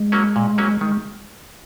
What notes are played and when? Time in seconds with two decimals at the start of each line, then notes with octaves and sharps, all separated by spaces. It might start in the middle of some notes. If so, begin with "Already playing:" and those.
Already playing: G#3
0.12 F#3 A#3 C#4
0.36 A#2
0.58 F#3 A#3 C#4
0.81 D#3 G#3